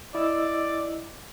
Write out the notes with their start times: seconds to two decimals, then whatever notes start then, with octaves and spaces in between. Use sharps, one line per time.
0.15 E4 D5 D#5 E6